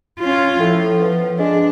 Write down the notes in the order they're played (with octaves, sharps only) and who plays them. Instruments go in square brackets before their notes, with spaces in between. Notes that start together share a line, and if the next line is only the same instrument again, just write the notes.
[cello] C#4 F4
[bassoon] A2 [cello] F3
[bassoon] B3
[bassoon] G#3 [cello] D4